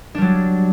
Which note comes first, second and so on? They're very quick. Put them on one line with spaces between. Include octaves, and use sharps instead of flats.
D4 G3 F#3